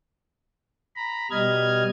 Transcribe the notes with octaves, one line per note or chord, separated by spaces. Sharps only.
A#5 B5
B2 G3 D#5 F6 G#6